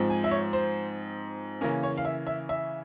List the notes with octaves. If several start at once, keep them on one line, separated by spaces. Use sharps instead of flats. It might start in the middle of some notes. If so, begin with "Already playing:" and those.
Already playing: G#2 F3 C4
G#5
E5
C#5
C5
C#3 E3 A#3 C#4 A#4
C#5
F5
E5
E5
E5